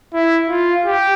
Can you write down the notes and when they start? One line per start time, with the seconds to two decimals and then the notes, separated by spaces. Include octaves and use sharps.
0.14 E4
0.50 F4
0.85 G4